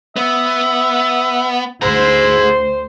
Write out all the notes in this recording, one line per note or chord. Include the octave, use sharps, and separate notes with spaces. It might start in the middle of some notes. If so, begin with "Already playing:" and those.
B3 E5
D2 E4 G#4 C5 A#5